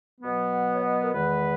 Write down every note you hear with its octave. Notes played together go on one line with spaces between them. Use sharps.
B2 F#3 B3
F#5
C#5
D#5
A#4
E2 D#3 G#3 B3 B4